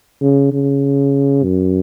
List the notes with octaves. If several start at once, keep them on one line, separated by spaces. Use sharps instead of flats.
C#3
C#3
F#2